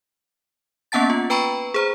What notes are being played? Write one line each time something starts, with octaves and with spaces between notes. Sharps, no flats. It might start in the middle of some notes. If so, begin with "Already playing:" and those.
A#3 B3 C#4 F#5 A5 A6
F4
B4 G5 A#5 B5 C#6
G#4 C5 A#5